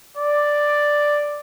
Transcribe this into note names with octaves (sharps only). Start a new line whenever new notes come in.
D5